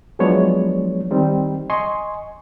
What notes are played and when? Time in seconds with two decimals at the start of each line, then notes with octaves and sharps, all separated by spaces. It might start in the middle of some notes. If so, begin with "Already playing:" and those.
0.19 F3 F#3 G#3 B3 D4 C#5
1.11 D#3 G3 C4 D#4
1.70 D#5 G#5 C6 C#6